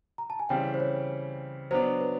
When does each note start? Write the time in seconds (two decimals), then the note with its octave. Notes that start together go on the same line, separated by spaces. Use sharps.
0.18 A#5
0.30 A5
0.39 G#5
0.49 C#3 E3 G3 C4 G5
0.74 C5
0.80 C#5
1.71 F#3 B3 D4 C5
2.01 B4